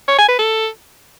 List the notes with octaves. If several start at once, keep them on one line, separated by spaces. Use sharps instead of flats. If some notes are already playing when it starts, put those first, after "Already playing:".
C#5
G#5
B4
A4